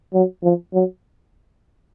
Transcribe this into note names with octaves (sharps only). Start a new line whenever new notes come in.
F#3
F3
F#3